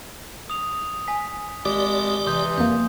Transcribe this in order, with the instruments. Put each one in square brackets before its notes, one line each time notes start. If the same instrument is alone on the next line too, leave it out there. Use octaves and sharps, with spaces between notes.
[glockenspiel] D#6 F7
G#5 B6
[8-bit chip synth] G#1 G#3 D#6 [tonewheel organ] G4 D5 [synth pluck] D6
[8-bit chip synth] C3 E3 [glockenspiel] C6 D#6 G6
[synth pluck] F2 A#3 [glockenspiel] G6